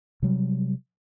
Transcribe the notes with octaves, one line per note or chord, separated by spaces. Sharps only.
C3 F#3 G3